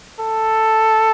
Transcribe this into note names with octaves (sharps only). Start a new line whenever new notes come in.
A4